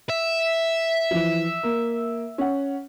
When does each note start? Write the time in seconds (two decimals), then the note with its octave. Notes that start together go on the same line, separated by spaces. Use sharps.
0.09 E5
1.11 E3 F3
1.63 A#3
2.38 C#4 F#5